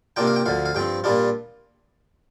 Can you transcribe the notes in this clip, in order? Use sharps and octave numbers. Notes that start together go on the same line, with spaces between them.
C3 A#3 D4 F4 G5
F5
G5
D2 D3 F3 F5
F5
G2 F3 C4 G5
A#2 G3 D4 F4